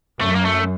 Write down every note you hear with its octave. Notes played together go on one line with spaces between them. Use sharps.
F#2 A3
A#3
A3